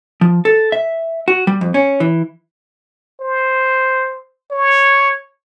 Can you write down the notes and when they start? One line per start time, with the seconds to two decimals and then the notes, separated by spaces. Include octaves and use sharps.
0.21 F3
0.45 A4
0.72 E5
1.28 F#4
1.47 G3
1.61 F2
1.74 C#4
2.00 E3
3.21 C5
4.51 C#5